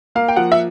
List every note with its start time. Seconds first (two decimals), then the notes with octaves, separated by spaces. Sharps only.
0.15 A#3 F5
0.28 G5
0.36 F3 F#5
0.52 E5